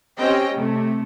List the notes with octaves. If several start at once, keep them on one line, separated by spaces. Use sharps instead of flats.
C4 C#4 G4 D#5 G5
C3 A3